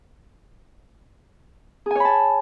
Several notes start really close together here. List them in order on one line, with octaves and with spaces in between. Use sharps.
G#4 G#5 C#5 B5 A5